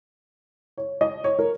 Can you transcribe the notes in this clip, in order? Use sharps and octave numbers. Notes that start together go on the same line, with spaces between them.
C#5
D#5
C#5
A#4